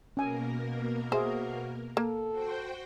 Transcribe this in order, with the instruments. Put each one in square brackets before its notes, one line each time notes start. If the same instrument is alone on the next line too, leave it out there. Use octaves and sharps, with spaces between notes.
[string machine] B2 A#3 A#4 [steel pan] C#4 G#5
[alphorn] F#4 [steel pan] G#4 E5 [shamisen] C5
[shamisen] A#3 [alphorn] A4
[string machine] F#4 C5 G5